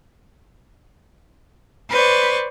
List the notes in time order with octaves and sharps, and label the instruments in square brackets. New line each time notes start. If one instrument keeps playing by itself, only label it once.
[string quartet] B4 C5 D5 C#6